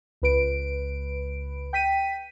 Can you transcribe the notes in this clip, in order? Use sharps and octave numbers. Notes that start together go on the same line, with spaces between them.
C#2 B4 D7
G5 B6 D#7